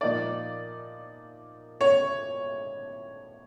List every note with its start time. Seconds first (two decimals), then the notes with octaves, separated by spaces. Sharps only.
0.01 A#2 F3 A#3 D#4 D5
1.81 C#5